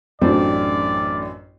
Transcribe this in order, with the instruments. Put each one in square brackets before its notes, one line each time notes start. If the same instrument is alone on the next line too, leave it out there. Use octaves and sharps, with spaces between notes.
[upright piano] A1 F#2 [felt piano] A3 D4 F#4 [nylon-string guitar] C4 [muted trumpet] D5